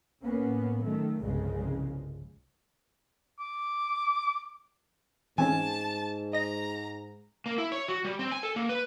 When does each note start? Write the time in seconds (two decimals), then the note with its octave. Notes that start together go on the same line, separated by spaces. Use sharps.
0.24 A2 A#3 B3 C#4
0.84 D#3 F#3 A3
1.20 G1 C2 C#3 F3 G#3
3.39 D6
5.38 G#2 E3 C4 C#4 G#5 A5
6.33 D#5 A#5 A#6
7.46 A#3
7.58 E4
7.72 C#5
7.88 F#4
8.04 G3
8.19 C4
8.31 G#5
8.43 A4
8.56 A#3
8.69 B4